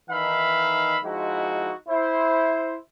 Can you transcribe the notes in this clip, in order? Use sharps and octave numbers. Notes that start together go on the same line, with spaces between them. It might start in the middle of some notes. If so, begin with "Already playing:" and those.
D#3 E3 D#4 E5 F5 B5
F3 G#3 D#4 E4 F#4
E4 C5